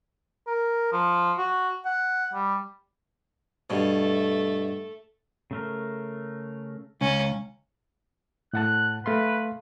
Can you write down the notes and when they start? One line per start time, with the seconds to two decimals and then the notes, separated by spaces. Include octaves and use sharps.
0.47 A#4
0.93 F3
1.38 F#4
1.85 F#5
2.33 G3
3.70 G2 B2 A3
5.51 C#3 A3 A#4
7.01 C#2 C#4
8.53 A2 F#5 A5 F#6
9.06 A3 B4 F5 C6